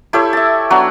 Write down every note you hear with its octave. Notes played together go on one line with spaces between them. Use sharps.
E4 G4 A4 C#5
E5 A5
F#3 B3 D4